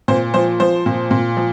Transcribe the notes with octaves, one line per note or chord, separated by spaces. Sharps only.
A#2 C5
F3 C5
F3 C5
A#2
A#2
F3